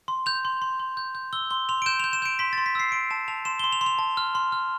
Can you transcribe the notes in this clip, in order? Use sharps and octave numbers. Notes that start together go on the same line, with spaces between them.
C6
G6 F7
C6
C6
C6
G6
G6
E6 G7
C6 G7
C6 F7
D7
G6 E7
G6 F7
E7
G6 D7
C6 B6
C6 A6
B6
E6 C7
C6 D7
A5 E7
A5 F7
C6 E7
C6 G7
F7
C6
F7
A5
F6
C6
F6